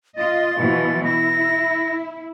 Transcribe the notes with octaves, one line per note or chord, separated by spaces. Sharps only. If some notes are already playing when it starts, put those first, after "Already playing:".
F4 D#5 A6
B2 E3 F3
E4 A#6